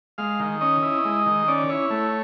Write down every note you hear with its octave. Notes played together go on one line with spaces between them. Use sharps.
G#3 F5
D#3
C#4 D#5
E4
G#3
D#3
C#4 D5
E4 C#5
A3